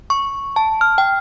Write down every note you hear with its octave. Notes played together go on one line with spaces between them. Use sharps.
C#6
A5
F6
G5